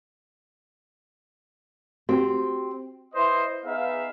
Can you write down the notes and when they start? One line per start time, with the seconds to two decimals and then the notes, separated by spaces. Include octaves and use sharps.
2.09 C4 F#4 G4
3.15 E4 B4 C5 D#5
3.65 B3 D#4 G#4 B4 E5 F5